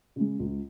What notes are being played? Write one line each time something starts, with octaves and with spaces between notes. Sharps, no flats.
C#3 G#3
C#2